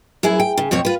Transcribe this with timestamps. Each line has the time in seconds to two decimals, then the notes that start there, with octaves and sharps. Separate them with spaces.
0.23 F#2 E4 G#4 B4
0.40 G5
0.58 C#3
0.71 F2 B2 C4 C#5
0.85 F4 B4